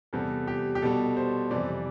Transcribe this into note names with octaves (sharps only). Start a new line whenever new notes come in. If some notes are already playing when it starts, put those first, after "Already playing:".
E2 C3 G3 A4
G4
G4
B2 G3 A4
C5
F2 C3 E3 G3 D5